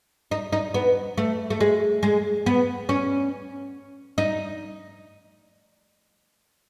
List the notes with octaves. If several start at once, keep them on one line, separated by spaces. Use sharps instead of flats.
D#4
D#4
B3
A3
A3
G#3
G#3
B3
C#4
D#4